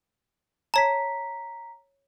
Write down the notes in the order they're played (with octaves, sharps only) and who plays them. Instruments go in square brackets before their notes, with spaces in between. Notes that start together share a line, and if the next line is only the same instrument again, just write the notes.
[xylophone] C#5 A5 [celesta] A#5 B6